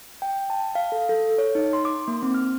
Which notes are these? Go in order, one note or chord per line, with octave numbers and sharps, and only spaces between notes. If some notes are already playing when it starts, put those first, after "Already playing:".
G5
A5
F5
A4
A4
C#5
D#4
C6
D6
A#3
C4
F6